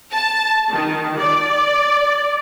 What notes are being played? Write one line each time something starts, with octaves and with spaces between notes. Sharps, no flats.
A5
D#3
D5